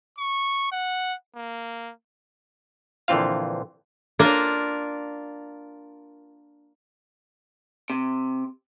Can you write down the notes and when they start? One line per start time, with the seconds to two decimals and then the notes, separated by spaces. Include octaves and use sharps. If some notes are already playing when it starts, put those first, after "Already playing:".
0.18 C#6
0.72 F#5
1.36 A#3
3.08 A#1 D3 E3 C4 F4 F5
4.19 A#3 D4 F4 A#4
7.90 C3